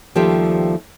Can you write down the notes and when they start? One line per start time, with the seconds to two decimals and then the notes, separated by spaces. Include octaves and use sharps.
0.15 D#2 F3 G3 A3 G4 C5